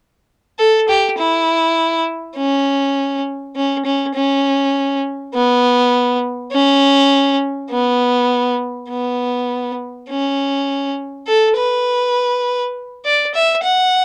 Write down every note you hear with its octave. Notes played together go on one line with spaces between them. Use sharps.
A4
G4
E4
C#4
C#4
C#4
C#4
B3
C#4
B3
B3
C#4
A4
B4
D5
E5
F#5